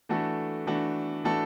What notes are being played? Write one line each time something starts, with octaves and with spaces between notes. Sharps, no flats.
E3 A3 D4 F#4 A4
E3 A3 D4 F#4 A4
E3 A3 D4 F#4 A4